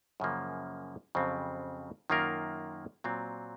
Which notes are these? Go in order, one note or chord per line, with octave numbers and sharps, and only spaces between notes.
F#2 C#3 F3 A#3
F2 C#3 F#3 C4
F#2 D#3 A#3 F4 A#4
A#2 F#3 C4